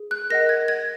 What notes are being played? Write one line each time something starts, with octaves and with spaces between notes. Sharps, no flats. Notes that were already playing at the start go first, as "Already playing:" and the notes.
Already playing: G#4
F#6
A#4 D#5 F#5 A#6
G#6
G#6